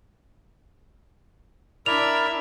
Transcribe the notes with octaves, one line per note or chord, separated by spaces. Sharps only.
D4 E4 A#4 D5 E5 F7